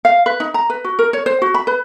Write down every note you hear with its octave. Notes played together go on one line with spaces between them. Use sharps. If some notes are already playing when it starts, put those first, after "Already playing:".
F5
B4
D#4
A#5
B4
F#4
A#4
C#5
C5
F#4
B5
B4